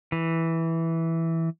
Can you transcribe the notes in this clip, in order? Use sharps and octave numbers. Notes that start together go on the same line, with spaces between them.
E3